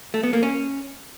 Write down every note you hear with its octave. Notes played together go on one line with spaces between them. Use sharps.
A3
B3
A#3
C#4